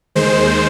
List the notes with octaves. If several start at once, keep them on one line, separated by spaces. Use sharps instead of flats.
D#2 D#3 G#3 C5